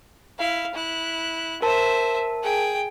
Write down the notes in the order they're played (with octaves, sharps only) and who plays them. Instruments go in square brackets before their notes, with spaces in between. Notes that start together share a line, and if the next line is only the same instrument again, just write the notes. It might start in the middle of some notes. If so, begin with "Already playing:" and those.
[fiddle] E4 F5
E4 F#6
[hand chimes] A#4 A5 [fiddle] C5 E5
[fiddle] G#4 G5